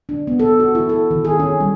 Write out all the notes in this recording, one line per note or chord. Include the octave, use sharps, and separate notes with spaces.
D4
B3
A4
F#4
E4
A4
D#3
G#4
C#4
G3